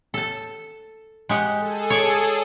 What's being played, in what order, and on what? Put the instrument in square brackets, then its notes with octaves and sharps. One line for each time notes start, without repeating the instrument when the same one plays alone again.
[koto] A4 A5
G#3 G4 F#5
[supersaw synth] G#4 A4
[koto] C#5 D5